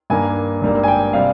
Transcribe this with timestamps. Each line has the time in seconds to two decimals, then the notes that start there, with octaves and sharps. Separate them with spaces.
0.10 G2 D#3 A#3 G#5
0.62 G#1 G2 G3 A#3
0.83 G#5
0.88 G5
1.13 C3 G3 F5